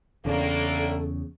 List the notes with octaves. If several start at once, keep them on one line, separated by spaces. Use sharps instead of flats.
E2 A2 C#3 A#3 D4 A4